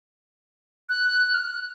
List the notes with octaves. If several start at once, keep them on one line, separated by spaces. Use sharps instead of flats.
F#6
F6
F#6